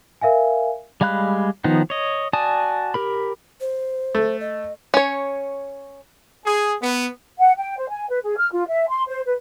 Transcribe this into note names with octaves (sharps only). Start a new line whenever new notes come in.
A#4 E5 F5 G#5
G3 G#3 F5 B5 F#6
D#3 F3 B3 D#4
C#5 D#5
F#4 D5 G#5 A5 D#6
G4 A#4 B5
C5
A3
D#5
C#4 C#5
G#4
B3
F#5
G5
C5
G#5
B4
G#4
F6
F4
E5
C6
C5
B4